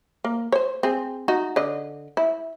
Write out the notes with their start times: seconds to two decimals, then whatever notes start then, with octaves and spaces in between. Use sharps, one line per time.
0.24 A#3
0.52 C5 C#5
0.83 C4 G#4
1.28 D#4 F#4
1.56 D3 D#5
2.17 E4